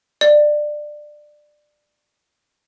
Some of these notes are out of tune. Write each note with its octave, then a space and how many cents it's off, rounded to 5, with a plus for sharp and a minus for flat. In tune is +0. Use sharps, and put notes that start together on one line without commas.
D5 +20